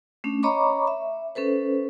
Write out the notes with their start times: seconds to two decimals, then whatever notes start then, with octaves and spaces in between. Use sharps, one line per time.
0.24 A3 C#4 D4
0.43 C#5 D#5 A#5 B5 C#6 D6
0.87 E5
1.35 C#4 A4 B4 C5